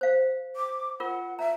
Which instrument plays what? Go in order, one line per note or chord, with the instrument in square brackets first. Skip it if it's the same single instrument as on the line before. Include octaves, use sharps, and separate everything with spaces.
[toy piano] C5 F5
[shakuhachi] D6
[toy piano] F4 A#4 [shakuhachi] F#5
[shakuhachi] E5 [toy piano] A#5